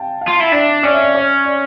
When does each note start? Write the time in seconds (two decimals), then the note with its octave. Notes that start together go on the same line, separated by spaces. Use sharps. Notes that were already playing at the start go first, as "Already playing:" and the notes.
Already playing: F5 G5 A5
0.21 F5
0.28 F4
0.41 E4
0.52 D4 E5
0.83 C#4 D5
0.93 E5
1.02 D5
1.15 C#5
1.45 D5